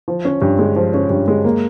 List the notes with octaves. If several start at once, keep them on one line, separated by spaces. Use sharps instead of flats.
F3
C#4
G2
G#3
F3
C#4
G2
G#3
A#3